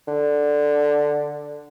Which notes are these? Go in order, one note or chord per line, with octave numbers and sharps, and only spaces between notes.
D3